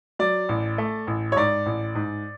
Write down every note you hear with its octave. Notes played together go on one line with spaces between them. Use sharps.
F#3 D5
A1
A3
A1
C#5
G#2 D5
A1
G#2